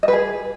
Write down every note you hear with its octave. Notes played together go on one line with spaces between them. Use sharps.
D#5
B4
G#4